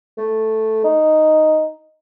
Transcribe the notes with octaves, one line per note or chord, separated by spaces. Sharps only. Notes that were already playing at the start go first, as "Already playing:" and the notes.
A3
D#4